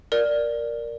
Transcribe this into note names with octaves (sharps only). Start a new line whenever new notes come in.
A#4 D5